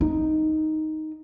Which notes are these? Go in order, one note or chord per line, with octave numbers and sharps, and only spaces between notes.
D#4